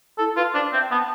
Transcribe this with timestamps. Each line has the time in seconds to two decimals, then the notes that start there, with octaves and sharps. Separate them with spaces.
0.18 E4 A4
0.36 F4 B4
0.54 D4 C5
0.64 D5
0.73 C4 E5
0.82 G5
0.90 B3 A5